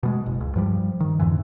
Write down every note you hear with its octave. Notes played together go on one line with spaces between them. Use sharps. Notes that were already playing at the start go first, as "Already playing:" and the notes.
B2 G3 G#3
F#1
C#2
G2 F3 G3
D#3
F2 G#2 D3 E3